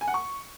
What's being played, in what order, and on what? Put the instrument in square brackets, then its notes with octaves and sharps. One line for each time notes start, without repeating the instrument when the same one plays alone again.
[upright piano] G#5
F#5
C#6